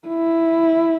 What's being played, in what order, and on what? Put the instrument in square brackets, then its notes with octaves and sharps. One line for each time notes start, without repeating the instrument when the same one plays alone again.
[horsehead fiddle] E4